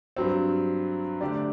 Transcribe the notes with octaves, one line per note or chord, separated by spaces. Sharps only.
G2 F#3 C4
D3 A3 D4 G4 D5